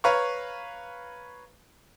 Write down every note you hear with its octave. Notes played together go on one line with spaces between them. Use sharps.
B4 C#5 F5 A#5 C#6